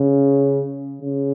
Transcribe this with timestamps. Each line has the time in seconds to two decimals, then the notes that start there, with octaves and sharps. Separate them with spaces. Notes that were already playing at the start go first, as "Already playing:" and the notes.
Already playing: C#3
1.02 C#3